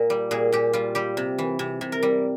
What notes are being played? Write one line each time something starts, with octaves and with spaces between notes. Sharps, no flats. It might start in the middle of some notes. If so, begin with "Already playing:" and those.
Already playing: A#2 A#4
G3
A#2 G#4
A#2 G4
G3 F4
G3 G4
C3
E3
C3
C3
A#4
G3